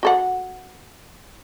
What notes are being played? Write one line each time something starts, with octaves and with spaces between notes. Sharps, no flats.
F#4 A4 F#5